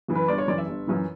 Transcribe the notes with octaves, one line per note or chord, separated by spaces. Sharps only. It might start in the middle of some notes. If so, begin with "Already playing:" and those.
F#2 E3
B4
G1 D5
C#5
F#2 E3 D5
E5
G1
F#2 E3